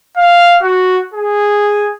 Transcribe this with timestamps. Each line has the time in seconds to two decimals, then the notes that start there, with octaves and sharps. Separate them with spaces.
0.17 F5
0.62 F#4
1.14 G#4